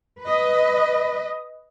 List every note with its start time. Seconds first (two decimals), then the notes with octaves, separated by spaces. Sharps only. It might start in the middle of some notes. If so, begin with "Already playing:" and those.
0.21 B4 D#5